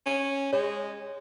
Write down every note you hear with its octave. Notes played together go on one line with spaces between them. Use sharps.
C#4
G#3 C#5